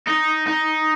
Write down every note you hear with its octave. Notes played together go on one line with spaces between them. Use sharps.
D#4
D#4